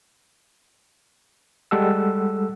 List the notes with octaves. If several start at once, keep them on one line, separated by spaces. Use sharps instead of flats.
G3 G#3 A4 F#5 E6